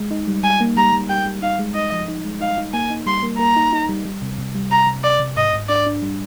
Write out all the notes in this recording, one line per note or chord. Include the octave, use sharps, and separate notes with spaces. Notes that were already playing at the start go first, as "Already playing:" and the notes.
Already playing: G#3
D#4
G3
G3 G#5
A#3
G3 A#5
G3
G3 G5
G3
D#4 F5
G#3
D#4 D#5
F3
D#4
G#3
D#4 F5
D#4
A#3 G#5
D#4
G3 C6
A#3
A#3 A#5
D#4
D#4
G3
G3
C3
C3
G3
C3 A#5
C3
C3 D5
C3
G#2 D#5
G#2
D4 D5
D4
G3